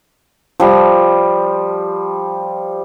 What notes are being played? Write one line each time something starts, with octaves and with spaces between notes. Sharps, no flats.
F3 G3